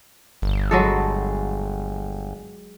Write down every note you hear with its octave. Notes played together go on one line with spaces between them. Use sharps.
G1
F#3 G#3 A4